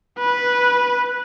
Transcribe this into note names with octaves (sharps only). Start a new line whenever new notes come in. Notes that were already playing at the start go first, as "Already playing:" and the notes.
B4